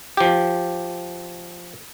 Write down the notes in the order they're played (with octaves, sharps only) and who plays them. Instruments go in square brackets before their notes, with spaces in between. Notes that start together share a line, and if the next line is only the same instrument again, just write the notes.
[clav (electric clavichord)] F3 G4